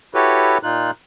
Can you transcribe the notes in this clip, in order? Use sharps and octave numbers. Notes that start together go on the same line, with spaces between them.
E4 F#4 G4 A4 B4 C#5
A#2 D#4 F4 F#6